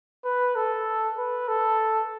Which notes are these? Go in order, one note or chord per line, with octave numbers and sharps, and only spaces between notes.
B4
A4
B4
A4